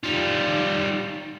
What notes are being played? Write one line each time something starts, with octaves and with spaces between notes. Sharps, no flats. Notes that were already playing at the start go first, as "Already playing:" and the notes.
G3 D#4 F4